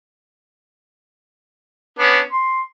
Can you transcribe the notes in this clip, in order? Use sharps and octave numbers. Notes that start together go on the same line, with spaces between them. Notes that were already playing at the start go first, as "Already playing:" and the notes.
B3 C#4 D4
C6